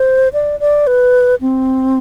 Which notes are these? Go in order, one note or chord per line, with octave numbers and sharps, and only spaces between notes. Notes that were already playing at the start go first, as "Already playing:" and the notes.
Already playing: C5
D5
D5
B4
C4